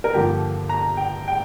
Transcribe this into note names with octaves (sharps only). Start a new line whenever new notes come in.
A#4
G2 D3 F3 A#3 G4
A#5
G5
G5